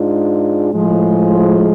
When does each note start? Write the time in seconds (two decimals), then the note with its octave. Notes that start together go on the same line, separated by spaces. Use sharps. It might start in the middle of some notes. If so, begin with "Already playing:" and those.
Already playing: G#2 G#3 D4 F4
0.72 A2 F3 G#3